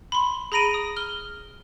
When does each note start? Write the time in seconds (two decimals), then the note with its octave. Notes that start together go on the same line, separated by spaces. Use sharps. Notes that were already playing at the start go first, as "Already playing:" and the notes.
0.12 B5 C6
0.52 G#4 A#5 B5 A#6 D7 D#7
0.74 D#6
0.97 F6 G7